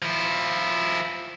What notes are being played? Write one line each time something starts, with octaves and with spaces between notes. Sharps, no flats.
F3 E4